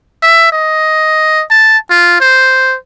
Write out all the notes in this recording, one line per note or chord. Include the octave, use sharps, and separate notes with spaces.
E5
D#5
A5
F4
C5